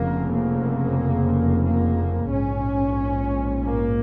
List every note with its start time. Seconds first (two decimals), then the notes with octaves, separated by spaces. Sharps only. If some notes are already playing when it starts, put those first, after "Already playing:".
Already playing: F1 F2 C#3 A#3
0.32 A#3
1.64 A#3
2.30 A#1 G#2 C#4
3.63 A#3